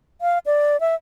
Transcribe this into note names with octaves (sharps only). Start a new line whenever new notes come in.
F5
D5
E5